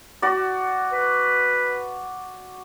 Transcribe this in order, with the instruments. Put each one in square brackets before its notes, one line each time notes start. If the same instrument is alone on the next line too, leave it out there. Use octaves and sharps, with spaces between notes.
[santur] F#4 D5
[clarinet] B4